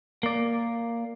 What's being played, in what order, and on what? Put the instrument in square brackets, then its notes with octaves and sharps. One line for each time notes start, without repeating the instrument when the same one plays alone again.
[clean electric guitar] A#3 D5